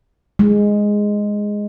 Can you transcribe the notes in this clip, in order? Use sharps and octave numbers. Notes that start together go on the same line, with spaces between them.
G#3